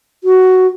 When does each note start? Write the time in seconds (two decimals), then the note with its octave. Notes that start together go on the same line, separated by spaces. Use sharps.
0.24 F#4